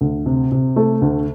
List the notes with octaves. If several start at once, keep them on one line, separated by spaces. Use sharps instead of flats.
D2
C3
C3
A3
D2